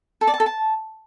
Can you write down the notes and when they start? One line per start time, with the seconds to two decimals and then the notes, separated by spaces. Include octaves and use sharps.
0.21 A4
0.27 D5
0.34 A5
0.40 A4
0.46 A5